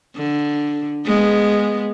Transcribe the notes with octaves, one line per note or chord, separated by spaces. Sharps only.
D3
G#3 B3